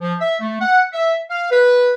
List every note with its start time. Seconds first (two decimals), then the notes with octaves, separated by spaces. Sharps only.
0.01 F3
0.20 E5
0.41 A3
0.61 F#5
0.93 E5
1.30 F5
1.51 B4